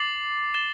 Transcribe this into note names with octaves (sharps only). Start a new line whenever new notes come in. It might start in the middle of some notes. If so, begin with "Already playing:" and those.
Already playing: D6 A6 C7 F#7
A6 E7 G7